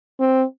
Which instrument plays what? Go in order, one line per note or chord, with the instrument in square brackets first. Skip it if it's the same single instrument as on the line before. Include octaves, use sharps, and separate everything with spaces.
[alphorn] C4